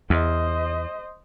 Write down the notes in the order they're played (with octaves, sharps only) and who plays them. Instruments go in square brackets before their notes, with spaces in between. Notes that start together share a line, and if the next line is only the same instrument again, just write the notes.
[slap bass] E2 [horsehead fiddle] C5 D#5